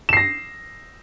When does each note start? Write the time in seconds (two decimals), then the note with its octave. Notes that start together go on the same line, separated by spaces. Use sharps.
0.09 E7
0.13 C7
0.17 A#6